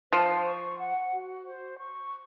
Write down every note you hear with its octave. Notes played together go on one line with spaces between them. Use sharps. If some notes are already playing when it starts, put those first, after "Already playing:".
F3 C5
C#6
F#5
F#4
C5
C#6